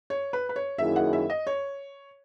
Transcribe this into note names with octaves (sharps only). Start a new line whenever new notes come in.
C#5
B4
B4
C#5
F#2 D#3 A#3 E4 G#4 E5
F#5
E5
D#5
C#5